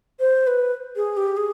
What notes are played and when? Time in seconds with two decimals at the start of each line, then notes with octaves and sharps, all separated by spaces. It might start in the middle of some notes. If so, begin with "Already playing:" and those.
0.20 C5
0.47 B4
0.96 G#4
1.17 G4
1.37 G#4